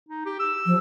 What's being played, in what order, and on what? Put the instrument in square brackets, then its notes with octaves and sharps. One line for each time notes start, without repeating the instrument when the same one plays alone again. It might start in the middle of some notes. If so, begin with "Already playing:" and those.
[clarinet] D#4
G4
E6
[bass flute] F3